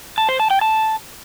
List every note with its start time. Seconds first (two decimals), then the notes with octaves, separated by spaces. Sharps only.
0.18 A5
0.29 C5
0.40 A5
0.50 G5
0.61 A5